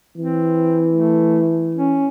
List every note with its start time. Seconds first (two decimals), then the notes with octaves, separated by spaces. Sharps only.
0.17 E3 C4
0.92 A3
1.75 C#4